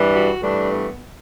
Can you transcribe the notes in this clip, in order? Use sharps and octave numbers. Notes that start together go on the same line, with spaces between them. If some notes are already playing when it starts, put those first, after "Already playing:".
Already playing: G2 E3 G3
F#4
G2 E3 A3 D4
B3